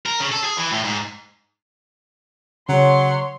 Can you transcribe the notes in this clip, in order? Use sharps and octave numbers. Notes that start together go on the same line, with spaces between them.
A#4
C#3
A4
G#4
E3
A2
G#2
C#3 F#3 C#5 C6